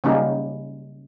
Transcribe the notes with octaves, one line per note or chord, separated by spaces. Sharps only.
C#3 F#3 G3 A#3 C#4 D#4